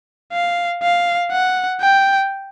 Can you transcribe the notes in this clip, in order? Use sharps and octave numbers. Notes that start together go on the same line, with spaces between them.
F5
F5
F#5
G5